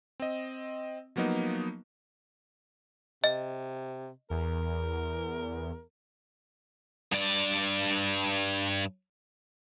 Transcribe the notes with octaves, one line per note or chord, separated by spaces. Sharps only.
C4 D#5
F3 F#3 A#3 B3 D#4
C3 D#5
E2 A#4
G2 D5